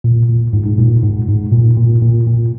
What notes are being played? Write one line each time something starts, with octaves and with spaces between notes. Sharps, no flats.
A#2
A#2
G#2
G#2
A#2
G#2
G#2
A#2
A#2
A#2
A#2